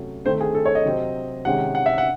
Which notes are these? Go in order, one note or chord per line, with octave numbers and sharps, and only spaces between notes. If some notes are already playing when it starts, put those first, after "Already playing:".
Already playing: C3 F#3 A3 C#4
D#3 A3 C4 C5
G#4
A4
C#5
D#5
C3 F#3 C4
C3 D#3 G#3 C#4 F#5
F#5
E5
F#5